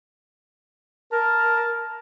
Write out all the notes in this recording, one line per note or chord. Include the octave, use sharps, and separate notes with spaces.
A#4 A5